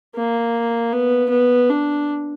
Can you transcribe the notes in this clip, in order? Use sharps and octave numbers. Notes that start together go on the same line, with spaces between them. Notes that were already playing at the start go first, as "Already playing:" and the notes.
A#3
B3
B3
D4